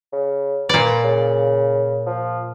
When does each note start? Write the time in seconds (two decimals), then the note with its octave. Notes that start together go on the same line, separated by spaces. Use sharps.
0.13 C#3
0.69 A#2 B4 D5
1.04 C#3
2.07 F3